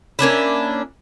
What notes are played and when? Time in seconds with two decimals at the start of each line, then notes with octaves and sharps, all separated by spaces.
0.19 A#3 C#4 D4 E4